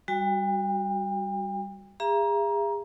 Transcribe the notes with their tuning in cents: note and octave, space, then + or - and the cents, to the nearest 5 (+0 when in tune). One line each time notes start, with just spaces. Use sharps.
G3 +0 F#4 +0 G5 +40
G#4 -35 E5 +40 A#5 +20